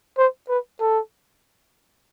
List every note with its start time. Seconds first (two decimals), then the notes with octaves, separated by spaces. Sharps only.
0.18 C5
0.49 B4
0.80 A4